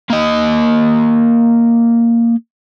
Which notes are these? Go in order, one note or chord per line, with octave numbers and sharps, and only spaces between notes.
A#3 D#5